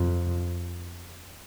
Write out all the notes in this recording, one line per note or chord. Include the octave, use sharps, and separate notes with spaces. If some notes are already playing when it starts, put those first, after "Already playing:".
Already playing: F2